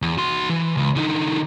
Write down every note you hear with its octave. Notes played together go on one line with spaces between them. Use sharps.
E2
F#4 C6
E3
C#2
D3 D#4